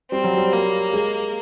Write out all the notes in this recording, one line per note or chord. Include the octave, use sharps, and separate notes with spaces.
G3 C4
F#3
G3
A#3
G#3